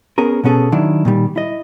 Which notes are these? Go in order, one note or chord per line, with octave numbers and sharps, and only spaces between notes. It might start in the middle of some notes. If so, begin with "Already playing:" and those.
B3 C#4 G#4 A#4
B2 B3 C#4 G#4 A4
D#3 F#3 D4 E4
A#2 D#3 G3
E4 D#5